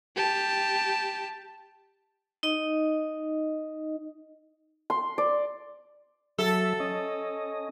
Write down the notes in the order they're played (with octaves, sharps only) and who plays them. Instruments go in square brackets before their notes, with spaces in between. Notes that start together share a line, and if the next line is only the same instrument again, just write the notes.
[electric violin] G4 A5
[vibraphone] D#4 D#5
[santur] C6
D5
[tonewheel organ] F#3 E5 [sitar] A4
[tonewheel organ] C#4 D#5